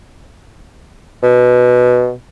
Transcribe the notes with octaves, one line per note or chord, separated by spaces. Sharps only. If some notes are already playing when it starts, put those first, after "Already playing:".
B2